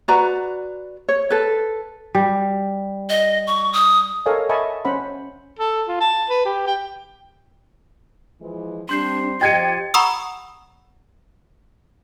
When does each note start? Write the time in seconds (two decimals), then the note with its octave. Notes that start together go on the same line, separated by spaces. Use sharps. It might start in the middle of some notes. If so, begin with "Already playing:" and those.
0.08 F#4 B4 D5 A#5
1.09 C#5
1.30 A4 B4
2.15 G3
3.09 D#5
3.47 C#6
3.73 D#6
4.26 A4 A#4 C#5 D#5 F5 G#5
4.49 D#5 E5 G#5 A5 B5 C#6
4.85 C#4 C5 F#5 B5
5.59 A4
5.88 F4
6.01 A5
6.30 B4
6.45 G4
6.67 G5
8.41 E3 F3 G#3
8.89 G3 C4 D4 C6 G6 C7
9.41 F3 G4 D#5 G5 G#6 A6 C#7 D#7
9.94 F#5 A#5 B5 C#6 D#6 E6